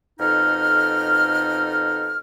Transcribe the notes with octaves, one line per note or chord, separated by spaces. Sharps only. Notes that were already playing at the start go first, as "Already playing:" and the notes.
F2 B2 D#4 A4 F6